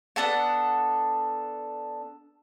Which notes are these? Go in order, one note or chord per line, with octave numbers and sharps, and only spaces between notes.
B3 D4 A4 F#5